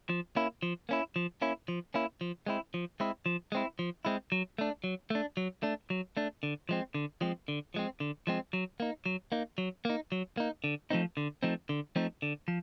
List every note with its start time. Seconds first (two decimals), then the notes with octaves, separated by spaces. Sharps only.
0.09 F3
0.36 A#3 C#4 E4
0.63 F3
0.89 A#3 C#4 E4
1.16 F3
1.42 A#3 C#4 E4
1.68 F3
1.94 A#3 C#4 E4
2.21 F3
2.47 G#3 C4 E4
2.74 F3
3.00 G#3 C4 E4
3.26 F3
3.52 G#3 C4 E4
3.79 F3
4.05 G#3 C4 E4
4.32 F#3
4.58 A3 D4
4.84 F#3
5.10 A3 D4
5.37 F#3
5.63 A3 D4
5.90 F#3
6.17 A3 D4
6.43 D3
6.69 F3 G#3 C4
6.95 D3
7.21 F3 G#3 C4
7.48 D3
7.74 F3 G#3 C4
8.00 D3
8.27 F3 G#3 C4
8.53 F#3
8.80 A#3 D#4
9.06 F#3
9.32 A#3 D#4
9.58 F#3
9.85 A#3 D#4
10.12 F#3
10.37 A#3 D#4
10.64 D3
10.90 F3 A3 C4 D#4
11.17 D3
11.43 F3 A3 C4 D#4
11.69 D3
11.96 F3 A3 C4 D#4
12.22 D3
12.48 F3